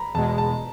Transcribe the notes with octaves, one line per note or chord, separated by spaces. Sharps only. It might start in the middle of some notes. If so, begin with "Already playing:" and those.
Already playing: A#5 B5
E2 B2 G#3 A5
A5